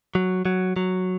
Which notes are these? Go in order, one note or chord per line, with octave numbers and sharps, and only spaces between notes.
F#3
F#3
F#3